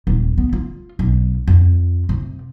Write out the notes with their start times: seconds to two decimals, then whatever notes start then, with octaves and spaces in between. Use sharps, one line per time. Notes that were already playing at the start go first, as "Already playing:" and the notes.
0.07 D#1
0.38 B3
0.53 F4
0.99 B1
1.48 F2
2.09 C3